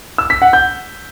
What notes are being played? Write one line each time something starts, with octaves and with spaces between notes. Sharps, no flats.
E6
B6
F#5
G6